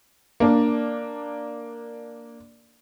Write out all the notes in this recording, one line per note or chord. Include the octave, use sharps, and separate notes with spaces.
A#3 D4